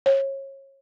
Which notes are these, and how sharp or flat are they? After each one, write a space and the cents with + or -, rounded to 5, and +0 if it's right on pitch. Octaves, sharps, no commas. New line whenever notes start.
C#5 -30